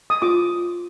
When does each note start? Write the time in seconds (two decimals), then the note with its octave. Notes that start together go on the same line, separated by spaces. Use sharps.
0.10 D#6
0.22 F4 D6